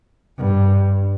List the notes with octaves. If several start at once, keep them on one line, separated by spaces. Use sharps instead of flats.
G2